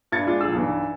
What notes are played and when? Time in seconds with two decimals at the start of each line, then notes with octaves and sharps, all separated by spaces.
0.12 G2 E5 G#6 A6 C#7
0.27 G#3 D4 F4
0.41 A#1 G#4 E6
0.53 B1 G2 E3